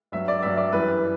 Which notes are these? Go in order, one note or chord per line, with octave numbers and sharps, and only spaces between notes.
G2 F#3 E5
D5
G2 F#3 E5
D5
F#2 E3 G3 B4